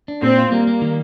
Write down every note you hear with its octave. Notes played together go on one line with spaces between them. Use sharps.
D4
A#2 C4
F4
G3 A#3
G3
D#3